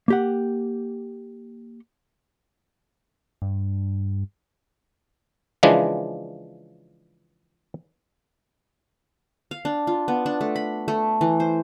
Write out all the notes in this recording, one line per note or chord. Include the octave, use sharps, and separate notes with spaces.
A#3 G4 F#5
G2
C#3 E3 F3 G#3 D4
F5
D4
F4
B3
D4
A3
B5
A3
E3
C5